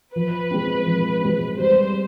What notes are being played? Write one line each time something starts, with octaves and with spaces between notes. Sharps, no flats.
F3 B4
G#3 C4
F3
G#3 C4
G3 C5